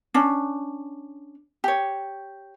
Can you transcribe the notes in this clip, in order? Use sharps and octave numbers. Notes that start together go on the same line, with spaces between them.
C#4 D4
G4 C#5